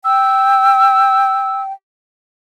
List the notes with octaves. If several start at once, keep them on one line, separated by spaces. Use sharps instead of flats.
G5 E6